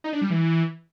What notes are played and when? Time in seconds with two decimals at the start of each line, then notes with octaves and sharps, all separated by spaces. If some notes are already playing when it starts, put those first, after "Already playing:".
0.04 D#4
0.13 D4
0.22 G3
0.30 E3